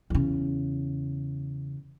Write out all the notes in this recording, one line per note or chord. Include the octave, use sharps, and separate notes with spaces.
E2 C#3